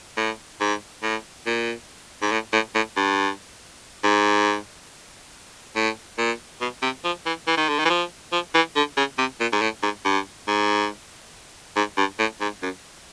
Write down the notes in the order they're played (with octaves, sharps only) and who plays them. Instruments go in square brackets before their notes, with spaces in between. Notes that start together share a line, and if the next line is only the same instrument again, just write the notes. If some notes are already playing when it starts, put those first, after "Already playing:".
[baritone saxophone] A2
G#2
A2
A#2
G#2
A2
A2
A2
G2
G#2
A2
A#2
B2
C3
F3
E3
E3
D#3
D3
D#3
E3
F3
F3
E3
D3
C#3
C3
A#2
G#2
A2
G#2
G2
G#2
G#2
G2
A2
G#2
F#2